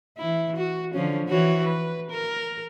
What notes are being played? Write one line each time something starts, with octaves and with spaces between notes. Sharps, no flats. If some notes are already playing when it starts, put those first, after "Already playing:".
E3 E4
F#4
D3 F3 C#4
E3 F#4 C#5
B4
A#4